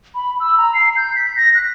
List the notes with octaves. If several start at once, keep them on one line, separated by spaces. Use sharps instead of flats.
B5
E6
A#5
C7
G6
B6
A#6
F#6